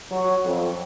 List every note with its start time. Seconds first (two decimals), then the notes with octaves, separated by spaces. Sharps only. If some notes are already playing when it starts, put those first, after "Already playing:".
0.11 F#3
0.45 F2